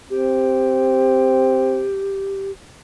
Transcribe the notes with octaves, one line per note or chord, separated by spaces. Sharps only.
C4 G4